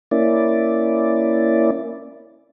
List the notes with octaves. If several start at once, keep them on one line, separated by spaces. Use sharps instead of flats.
A#3 C#4 E4 D5